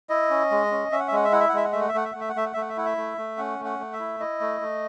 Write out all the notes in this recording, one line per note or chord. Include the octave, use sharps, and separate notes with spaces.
E4 D#5
C#4
G#3
C#4
C#4 E5
F#5
E5
G#3 F#5
E5
E4 F#5
E5
F#5
G#3 E5
F#5
A3 E5
F#5
E5
A3 F#5
E5
A3 F#5
E5
F#5
A3 E5
F#5
A3 E5
F#5
E5
E4 F#5
E5
A3
A3
C#4 F#5
A3
F#5
A3
E5
E4
E4 D#5
A3
A3